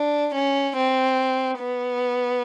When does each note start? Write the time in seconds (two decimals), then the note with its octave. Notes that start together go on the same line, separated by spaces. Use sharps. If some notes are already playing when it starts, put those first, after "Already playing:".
Already playing: D4
0.34 C#4
0.76 C4
1.58 B3